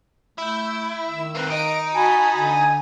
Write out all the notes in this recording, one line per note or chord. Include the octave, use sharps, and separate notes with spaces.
A3 E4 E6 G6
D#3 E6
A#3 C4 B4
D#4 D#5 D7
F#4 G#5 A5 B5
D3 G#5